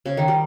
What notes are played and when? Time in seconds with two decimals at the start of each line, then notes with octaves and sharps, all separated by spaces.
0.06 C#3
0.17 D#3
0.28 G3